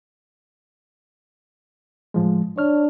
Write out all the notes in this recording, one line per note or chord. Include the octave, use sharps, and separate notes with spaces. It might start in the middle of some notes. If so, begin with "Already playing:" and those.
A2 F3 G#3
D4 C#5 F6